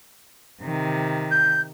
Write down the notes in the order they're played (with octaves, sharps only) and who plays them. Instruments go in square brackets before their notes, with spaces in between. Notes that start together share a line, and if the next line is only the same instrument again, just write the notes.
[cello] C3 D#3
[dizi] G6